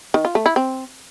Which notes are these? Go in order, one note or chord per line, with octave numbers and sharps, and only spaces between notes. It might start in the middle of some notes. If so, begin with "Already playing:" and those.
D#3
F4
A3
E4
C4